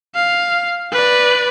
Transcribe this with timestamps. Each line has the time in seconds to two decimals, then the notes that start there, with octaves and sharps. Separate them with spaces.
0.15 F5
0.92 B4 D5